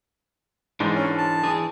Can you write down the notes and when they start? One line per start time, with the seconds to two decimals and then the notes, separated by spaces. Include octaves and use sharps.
0.80 G#2 E3 D4
0.95 C#4
1.18 A5
1.43 E3 G#4